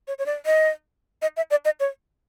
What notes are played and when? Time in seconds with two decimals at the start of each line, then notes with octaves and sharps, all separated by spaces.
0.08 C#5
0.19 C#5
0.26 D5
0.46 D#5
1.22 D#5
1.37 E5
1.51 D5
1.65 D#5
1.80 C#5